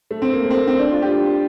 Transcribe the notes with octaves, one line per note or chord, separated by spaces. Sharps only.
A3
C4
A#3
A3
C4
A#3
C4
D4
F4
G4